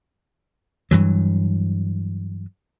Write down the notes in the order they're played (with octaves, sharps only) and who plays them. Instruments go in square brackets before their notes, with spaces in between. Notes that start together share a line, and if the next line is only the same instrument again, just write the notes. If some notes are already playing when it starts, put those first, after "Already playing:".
[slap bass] G2 E3 F#3